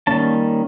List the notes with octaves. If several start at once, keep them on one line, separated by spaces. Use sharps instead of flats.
D#3 G3 A#3 C#4 A5